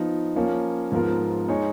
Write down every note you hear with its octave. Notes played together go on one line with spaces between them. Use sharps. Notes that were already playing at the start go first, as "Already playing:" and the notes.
Already playing: F3 B3 D#4
F3 A#3 C#4 F4
G#2 F3 B3 F4 A#4
G#3 D#4 G#4 C#5